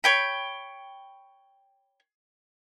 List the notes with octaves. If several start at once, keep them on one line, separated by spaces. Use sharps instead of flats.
C#5 G5 B5